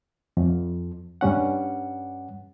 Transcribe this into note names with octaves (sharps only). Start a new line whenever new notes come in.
F2
G2 G3 C#4 F#5